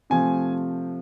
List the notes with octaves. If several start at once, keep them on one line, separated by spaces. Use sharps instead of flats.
C3 F3 A3 C4 G#5